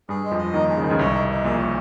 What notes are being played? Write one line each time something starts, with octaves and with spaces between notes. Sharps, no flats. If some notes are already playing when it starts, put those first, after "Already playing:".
G2 G3 G#4
G#3
F2 F3
D#5
D#2 D#3 D#4
G#4
C#3
D#3 G#3
C#2 C#3
C2 C3 C#5
D#4
D#4
A#1 A#2 G#4
C#5